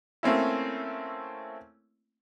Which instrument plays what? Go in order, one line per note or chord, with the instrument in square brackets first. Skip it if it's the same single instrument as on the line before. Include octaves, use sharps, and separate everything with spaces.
[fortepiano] A3 A#3 C4 C#4 E4